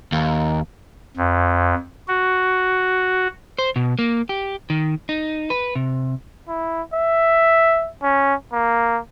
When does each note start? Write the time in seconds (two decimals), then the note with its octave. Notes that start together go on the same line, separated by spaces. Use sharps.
0.12 D#2
1.17 F2
2.08 F#4
3.59 C5
3.76 B2
3.99 A#3
4.29 G4
4.70 D#3
5.09 D#4
5.50 B4
5.75 C3
6.48 E4
6.94 E5
8.03 C#4
8.53 A#3